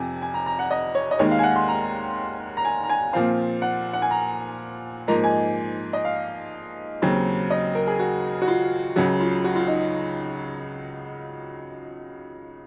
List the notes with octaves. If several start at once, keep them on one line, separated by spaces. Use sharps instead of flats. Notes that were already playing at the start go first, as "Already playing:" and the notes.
Already playing: F2 C3 F3 G#5
G#5
A#5
A#5
F#5
D#5
C#5
D#5
D#2 D#3 G#3 C#5
F5
G#5
F#5
C6
A#5
A#5
G#5
A#5
G#5
A#2 F3 C4 F5
F#5
F#5
G#5
A#5
G#2 F3 A#3 D#4 A#5
G#5
D#5
F5
D#2 C#3 F#3 C4
D#5
A#4
G#4
F#4
F#4
F4
C#2 C#3 F#3 F#4
F4
F#4
F4
D#4